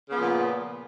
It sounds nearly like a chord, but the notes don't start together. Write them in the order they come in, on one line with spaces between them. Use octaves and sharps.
C#3 B3 F3 A#2